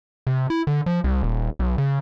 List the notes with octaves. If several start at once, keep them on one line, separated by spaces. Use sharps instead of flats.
C3
E4
D3
F3
C2
D#1
B1
C#3